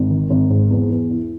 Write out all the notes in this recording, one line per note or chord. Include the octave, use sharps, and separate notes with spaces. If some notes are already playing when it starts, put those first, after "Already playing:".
Already playing: G#1
D#3
G#1
G#2
E2
E2
E4